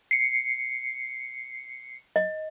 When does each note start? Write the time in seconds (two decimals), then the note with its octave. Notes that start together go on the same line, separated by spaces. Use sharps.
0.11 C7 C#7
2.16 D#5